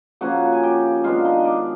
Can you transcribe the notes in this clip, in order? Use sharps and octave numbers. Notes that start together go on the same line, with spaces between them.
C#3 F3 A#3 C#4 F#4 F#5
A5
G#5
G4 G5
D#3 G#3 B3 D4 F4 F5
D#4 D#5
D4 D5